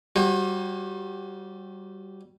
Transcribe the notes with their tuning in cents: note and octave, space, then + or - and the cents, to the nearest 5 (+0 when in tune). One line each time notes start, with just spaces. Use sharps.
G3 -15 F#4 -15 C5 +45